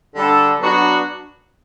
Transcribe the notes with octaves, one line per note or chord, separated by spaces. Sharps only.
D3 G3 D4 A4
F#3 B3 D4 F#4